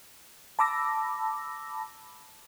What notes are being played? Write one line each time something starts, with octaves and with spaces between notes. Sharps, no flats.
A5 B5 D6 E6 A#6